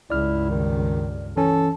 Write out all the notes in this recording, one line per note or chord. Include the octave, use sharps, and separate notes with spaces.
C#2 G2 E4 D5 F6
D#3
E3 C#4 A4